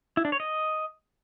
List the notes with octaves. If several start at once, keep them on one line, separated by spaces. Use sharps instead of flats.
E4
D4
C#5
D#5